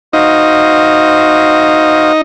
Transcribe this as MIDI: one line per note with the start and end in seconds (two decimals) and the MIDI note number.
0.13 2.21 63
0.13 2.12 66
0.13 2.12 72
0.13 2.12 77